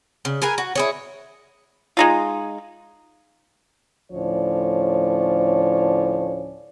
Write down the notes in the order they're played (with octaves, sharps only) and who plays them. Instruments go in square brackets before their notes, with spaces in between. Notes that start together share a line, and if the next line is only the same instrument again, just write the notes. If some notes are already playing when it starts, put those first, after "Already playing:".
[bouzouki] C#3
G#4 A#4 B4 G#5
F#4
E4 G#4 C#5
[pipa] G#3 D#4 F4
[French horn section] D2 A2 F3 C#4 C#5 D5